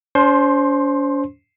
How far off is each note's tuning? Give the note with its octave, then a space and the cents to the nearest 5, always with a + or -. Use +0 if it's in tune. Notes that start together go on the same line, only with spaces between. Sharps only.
C#4 +45 C5 +0 C6 +20